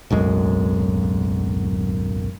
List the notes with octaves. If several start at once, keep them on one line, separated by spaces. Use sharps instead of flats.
D1 B1 F#2 G#3